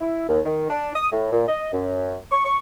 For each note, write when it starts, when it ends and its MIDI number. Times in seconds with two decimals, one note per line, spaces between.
0.01 0.25 64
0.29 0.40 39
0.45 0.66 51
0.70 0.90 62
0.95 1.08 87
1.12 1.32 45
1.32 1.46 46
1.48 1.72 75
1.73 2.16 42
2.31 2.44 85
2.45 2.59 85